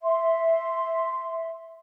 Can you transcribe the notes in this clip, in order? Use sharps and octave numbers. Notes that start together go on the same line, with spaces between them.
E5 C6